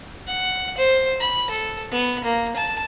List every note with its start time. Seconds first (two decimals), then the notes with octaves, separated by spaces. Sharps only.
0.27 F#5
0.78 C5
1.20 B5
1.50 A4
1.91 B3
2.24 A#3
2.56 A5